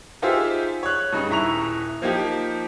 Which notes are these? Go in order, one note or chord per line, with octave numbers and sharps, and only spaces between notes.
D#4 F4 G4 G#4 C5 E5
C#5 F#6
G2 C#3 D#4
D#1 E4 A#5 C#6 F7
F3 A#3 D#4 G4